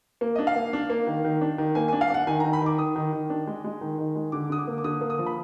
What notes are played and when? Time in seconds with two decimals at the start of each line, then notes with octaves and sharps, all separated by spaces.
0.21 A#3
0.35 D4 D#5
0.47 F5
0.56 A#3
0.73 D4
0.90 A#3
1.07 D#3
1.24 D#3
1.41 D4
1.58 D#3
1.75 A#3 G#5
1.88 G#5
1.93 D4
2.01 F5
2.10 D4 F#5
2.27 D#3 G#5
2.40 A#5
2.44 D#3
2.53 B5
2.61 D#3
2.66 D6
2.79 D#3 D#6
2.96 D#3
3.13 D#3
3.30 D4
3.47 G#3
3.64 G#3
3.81 D#3
3.99 D#3
4.16 G#3
4.32 D3 D6
4.50 D3 D#6
4.58 D6
4.67 A#3
4.78 D6
4.84 D3 D#6
5.01 A#3
5.10 D#6
5.19 F3
5.26 B5